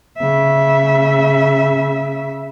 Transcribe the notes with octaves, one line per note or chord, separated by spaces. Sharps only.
C#3 E5